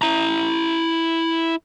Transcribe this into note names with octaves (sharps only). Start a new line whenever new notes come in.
E4 A#5